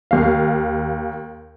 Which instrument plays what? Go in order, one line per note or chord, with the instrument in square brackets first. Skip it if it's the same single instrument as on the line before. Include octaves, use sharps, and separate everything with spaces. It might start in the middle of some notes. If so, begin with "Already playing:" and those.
[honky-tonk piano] D#2 F5